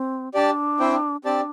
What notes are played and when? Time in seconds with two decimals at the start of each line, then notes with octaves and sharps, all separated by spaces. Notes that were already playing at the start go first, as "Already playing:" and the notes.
Already playing: C4
0.34 D4 G4 D5 A5
0.80 C4 E4 C5 G5
1.25 C4 D4 G4 D5 A5